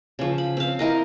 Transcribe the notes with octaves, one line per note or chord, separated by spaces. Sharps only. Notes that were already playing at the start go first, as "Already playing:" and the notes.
C#3 F3
B5
C4 F5
E4 A#4 D#5